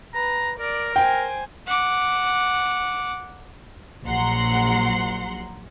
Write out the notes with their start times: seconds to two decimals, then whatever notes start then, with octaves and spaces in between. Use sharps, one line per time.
0.14 B4 A#5
0.60 A#4 D5
0.96 C5 G5 G#5
1.67 F#5 D6
4.06 A#1 F#3 F#5 A#5 C6 C7